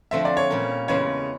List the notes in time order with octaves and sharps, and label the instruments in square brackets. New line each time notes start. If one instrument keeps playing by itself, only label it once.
[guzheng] D3 F3 A3 C4 [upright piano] E5
[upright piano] D5
C#5
[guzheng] A#2 G3 A#3 C#4
[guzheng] E2 C#3 E3 G#3 [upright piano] C#5